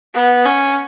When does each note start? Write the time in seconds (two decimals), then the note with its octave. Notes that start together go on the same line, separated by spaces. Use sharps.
0.14 B3
0.45 C#4